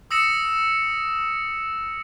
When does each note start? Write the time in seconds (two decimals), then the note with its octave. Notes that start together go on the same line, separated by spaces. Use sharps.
0.11 D#6 E6 A#6 C#7 E7